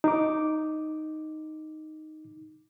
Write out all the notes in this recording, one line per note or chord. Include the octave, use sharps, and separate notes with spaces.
D#4 D6